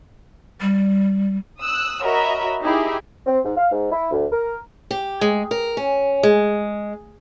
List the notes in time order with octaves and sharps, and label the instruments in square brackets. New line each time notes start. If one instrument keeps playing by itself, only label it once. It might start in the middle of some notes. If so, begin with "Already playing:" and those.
[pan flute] G3
[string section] D#6 E6 F#6
F#4 A#4 C#5 D#5 E5 B5
D#4 E4 G4 G#4
[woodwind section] C4
G#2
F5
G#2
E4
D2
A#4
[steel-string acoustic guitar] G4
G#3
A#4
C#4
G#3